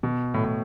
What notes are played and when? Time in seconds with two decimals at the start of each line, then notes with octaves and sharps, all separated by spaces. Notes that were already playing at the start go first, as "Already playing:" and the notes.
0.03 B2
0.34 A2
0.45 A2